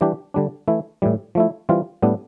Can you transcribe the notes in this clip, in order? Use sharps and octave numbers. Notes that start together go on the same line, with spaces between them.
E3 G3 D4 G4
D3 G3 D4
E3 A3 E4
A2 E3 G3
F3 A3 E4
E3 G3 C4 F4
A2 G3 B3 D4